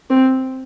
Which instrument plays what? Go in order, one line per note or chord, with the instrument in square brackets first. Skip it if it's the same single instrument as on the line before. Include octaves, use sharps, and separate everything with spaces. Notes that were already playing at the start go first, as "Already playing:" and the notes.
[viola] C4